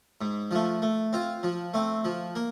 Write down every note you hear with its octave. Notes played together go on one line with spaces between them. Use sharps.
G#2
F3 A3
A3
C4 F4
F3
A3 C4
F3
A#3